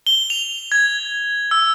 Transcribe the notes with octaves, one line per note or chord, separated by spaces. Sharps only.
G7
F7
G#6
E6